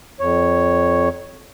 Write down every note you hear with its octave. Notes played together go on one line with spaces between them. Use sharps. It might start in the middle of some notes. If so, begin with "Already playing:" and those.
F2 C#5